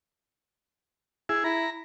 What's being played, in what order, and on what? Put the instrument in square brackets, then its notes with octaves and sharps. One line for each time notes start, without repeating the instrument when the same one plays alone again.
[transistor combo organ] E4 G#4
[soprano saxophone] E4 [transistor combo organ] A#5